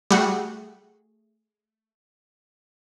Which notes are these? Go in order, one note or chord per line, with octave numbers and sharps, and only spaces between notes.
G3 A3 F#4 G#4